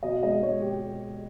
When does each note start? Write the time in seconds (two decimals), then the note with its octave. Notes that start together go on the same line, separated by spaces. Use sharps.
0.03 B2 D#5
0.23 G#3 D#5
0.42 G#3 C#5
0.62 B2 G4